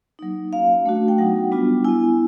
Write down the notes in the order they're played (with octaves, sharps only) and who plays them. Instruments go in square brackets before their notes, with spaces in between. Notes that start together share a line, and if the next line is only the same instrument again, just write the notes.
[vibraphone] F#3 A#3 D#4
A#3 C#4 F#4 F5
A3 D4 F#4
G5
F#3 B3 D#4 F#4 F#5
G3 B3 D4 F4
B3 E4 G#5